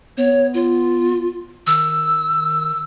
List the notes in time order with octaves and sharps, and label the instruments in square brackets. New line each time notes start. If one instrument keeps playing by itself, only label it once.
[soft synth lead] B3 [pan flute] C#5
[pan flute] F4
[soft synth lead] D#3 [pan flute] E6